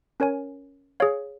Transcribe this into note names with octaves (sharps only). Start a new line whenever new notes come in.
C#4 A#4 C#5 G#5
G#4 C#5 F5